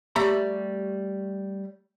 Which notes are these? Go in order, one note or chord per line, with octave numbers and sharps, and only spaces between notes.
G3 A3 G4 A#5 B5